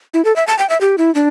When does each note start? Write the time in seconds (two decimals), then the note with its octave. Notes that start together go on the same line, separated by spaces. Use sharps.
0.14 E4
0.25 A4
0.36 E5
0.47 A5
0.59 G5
0.70 E5
0.81 G4
0.98 E4
1.15 D4